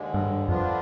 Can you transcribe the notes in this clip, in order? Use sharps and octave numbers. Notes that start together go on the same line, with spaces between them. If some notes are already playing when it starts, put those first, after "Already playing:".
Already playing: D#2 D3 G#3
G2
F2 D3 F3 B3 D4 F4